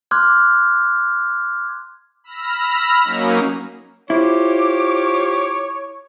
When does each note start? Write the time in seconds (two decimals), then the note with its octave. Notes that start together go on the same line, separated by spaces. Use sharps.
0.11 C6 D6 F6 F#6 G#6
2.24 B5 E6 F6 A#6
3.03 F#3 A#3 C#4 D#4
4.10 E4 F4 G4 C5 C#5 D6